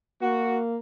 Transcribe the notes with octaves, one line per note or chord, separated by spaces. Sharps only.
A#3 F#4